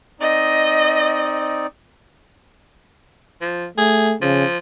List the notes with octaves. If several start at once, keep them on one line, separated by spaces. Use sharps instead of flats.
C4 D#4 D5 D#5
F3
A3 G#4
C#3 F3